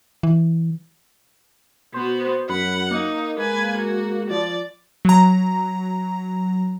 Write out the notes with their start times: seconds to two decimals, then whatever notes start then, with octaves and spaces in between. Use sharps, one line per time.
0.23 E3
1.94 B2 B3 F#4 C5
2.50 F#2 F#5 B5
2.91 A#3 D#4
3.39 G#3 B4 G#5
3.78 F#4
4.30 F3 D5
5.05 F#3 A#5